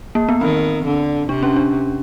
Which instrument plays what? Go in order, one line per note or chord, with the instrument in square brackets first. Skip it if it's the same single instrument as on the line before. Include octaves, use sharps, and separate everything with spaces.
[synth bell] A#3
B3
[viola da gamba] D#3 [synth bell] C4
[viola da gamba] D3
[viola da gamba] C3 [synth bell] D4
[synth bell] C#4
D4